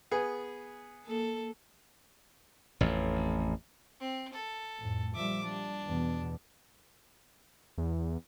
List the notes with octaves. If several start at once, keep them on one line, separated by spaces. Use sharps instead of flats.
B3 G#4
A#3 A4
A1 F2
C4
A4
F2 A2
A#2 F3 G3 E5 D6
G3 D4
E2 B2
E2